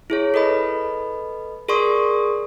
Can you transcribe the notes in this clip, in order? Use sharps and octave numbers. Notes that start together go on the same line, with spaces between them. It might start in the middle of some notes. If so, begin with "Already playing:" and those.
E4 G#4 C#5
A4 B4 D#5 B5
G#4 A#4 D5 C6 C#6 D#6